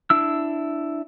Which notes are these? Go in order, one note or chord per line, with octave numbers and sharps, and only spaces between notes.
D4 E4 E6